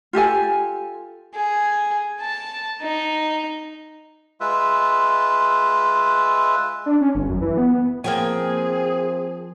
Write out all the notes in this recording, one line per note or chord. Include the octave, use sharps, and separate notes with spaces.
F4 G4 A4 G#5
G#4
A5
D#4
G#3 F4 B4 E5
D4
C#4
G1
F#2
E3
B3
F3 A#3 C4 G#4 G5 G#5